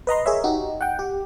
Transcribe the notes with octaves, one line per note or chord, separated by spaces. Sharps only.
B4 D#5 A#5 C6
G#4 A#4 C#5 E5
D#4 F#4 G4
F#5 G5
G4